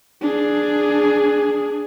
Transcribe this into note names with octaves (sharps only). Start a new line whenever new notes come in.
D4 G#4